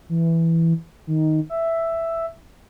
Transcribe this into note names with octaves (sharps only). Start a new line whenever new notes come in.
E3
D#3
E5